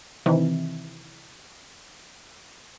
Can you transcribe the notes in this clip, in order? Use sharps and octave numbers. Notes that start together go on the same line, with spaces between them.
C3 D#3 E3